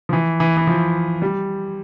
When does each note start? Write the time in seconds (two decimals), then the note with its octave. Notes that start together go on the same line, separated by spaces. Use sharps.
0.09 F3
0.13 E3
0.40 E3
0.57 E3
0.67 F3
1.22 G3